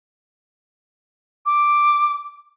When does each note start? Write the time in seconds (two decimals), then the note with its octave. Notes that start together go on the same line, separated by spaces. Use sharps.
1.46 D6